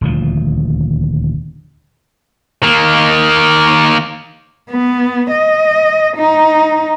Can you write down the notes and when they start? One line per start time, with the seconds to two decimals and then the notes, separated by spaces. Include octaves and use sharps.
0.01 D#1 D2 F3
2.63 D#3 A#3
4.71 B3
5.31 D#5
6.17 D#4